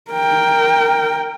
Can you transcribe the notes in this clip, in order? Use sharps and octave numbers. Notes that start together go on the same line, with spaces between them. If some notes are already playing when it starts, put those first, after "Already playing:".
A#4 G5